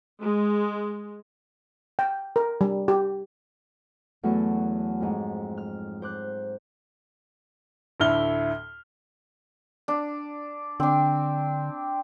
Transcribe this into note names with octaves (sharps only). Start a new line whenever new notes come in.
G#3
G5
A#4
G3
G4
E2 F#3 A3 A4 C#6
F2 G#2
F6
C5 D6 F#6
D2 A2 E4 F6 G7
D4
D3 C4 D4